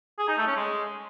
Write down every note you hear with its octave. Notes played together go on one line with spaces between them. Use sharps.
G#4
D#4
A3
C#4
G#3